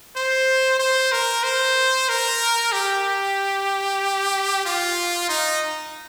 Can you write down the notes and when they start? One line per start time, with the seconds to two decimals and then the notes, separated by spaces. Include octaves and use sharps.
0.16 C5
0.79 C5
1.12 A#4
1.43 C5
2.09 A#4
2.72 G4
4.66 F4
5.29 D#4